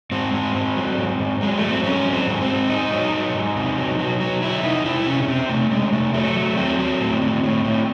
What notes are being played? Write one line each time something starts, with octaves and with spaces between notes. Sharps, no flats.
G#2 C4
G#2
G#2
F#3
G#2
G#2
F#3 G#3
A3
F#3
C4
G#2 C#4
F#3
C4
G#2
C4
G#2
G#2 D#4
F#3
F#3
G#2
C3
F#3
F#3
F#3
F#3 E4
C3 D#4
C3 E4
C3 C#4
C#4
C3 C4
C3 A3
C3 G#3
C3 A3
F#3 A3
F#3
F#3 C4
F#3
A2
A2
A2
A2